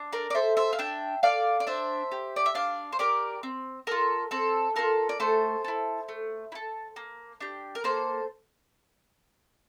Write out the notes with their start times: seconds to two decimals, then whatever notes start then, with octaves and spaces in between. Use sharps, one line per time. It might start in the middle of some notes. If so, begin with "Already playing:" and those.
Already playing: D4
0.13 A#4 D5
0.30 D5
0.35 A4 C5 E5
0.57 C5 E5
0.73 F5
0.79 D4 E5 G5
1.23 A4 D5 F5
1.60 D5
1.67 D4 C5 E5
2.12 G4
2.36 D5
2.46 E5
2.55 D4 D5 F5
2.92 C5
2.99 G4 A#4 D5
3.43 C4
3.87 F4 A4 A#4
4.31 C4 A4
4.76 F4 A4 A#4
5.09 D5
5.20 A3 A4 C5
5.64 E4 A4
6.09 A3
6.52 E4
6.55 A4
6.96 A#3
7.41 D4 G4
7.75 A#4
7.84 A#3 A4 C5